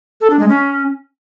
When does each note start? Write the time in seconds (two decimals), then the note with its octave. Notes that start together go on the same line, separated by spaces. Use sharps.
0.21 A4
0.30 D4
0.39 G#3
0.49 C#4